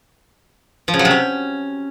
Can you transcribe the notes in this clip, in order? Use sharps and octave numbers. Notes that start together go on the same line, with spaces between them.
F3
C#3
F#3
C3
C#4